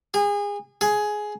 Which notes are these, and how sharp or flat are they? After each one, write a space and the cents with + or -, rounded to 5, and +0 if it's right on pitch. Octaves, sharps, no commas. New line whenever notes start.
G#4 -30
G#4 +10